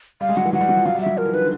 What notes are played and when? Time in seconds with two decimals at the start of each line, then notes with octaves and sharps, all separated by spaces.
0.21 G3 F5
0.29 G#3
0.37 F#3 F#5
0.45 E3
0.53 F#3 F#5
0.61 G3
0.69 F#3
0.77 F3
0.85 F#3 F5
0.95 G3
1.01 E5
1.06 F#3
1.17 F3 A#4
1.26 E3
1.34 D#3 B4
1.41 D3